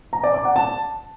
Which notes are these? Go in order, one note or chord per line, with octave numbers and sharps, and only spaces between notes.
A#5
D5
D6
F#5
A5